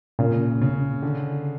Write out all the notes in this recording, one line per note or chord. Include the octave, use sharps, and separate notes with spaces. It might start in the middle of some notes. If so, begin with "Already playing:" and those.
A#2 C#3
C#3
D3